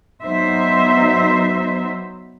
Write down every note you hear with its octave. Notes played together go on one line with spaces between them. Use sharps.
F#3 B3 D#4 C5 E5